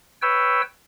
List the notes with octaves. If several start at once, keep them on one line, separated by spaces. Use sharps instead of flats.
B4 C#5 G5 E6